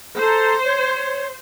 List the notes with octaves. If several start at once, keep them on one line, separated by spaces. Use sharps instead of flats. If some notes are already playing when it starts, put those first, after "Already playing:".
A4 C5 A#5
C#5